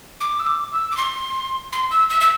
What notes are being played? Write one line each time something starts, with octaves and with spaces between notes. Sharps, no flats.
D6
E6
D6
E6
D6
C6
C6
E6
E6
E6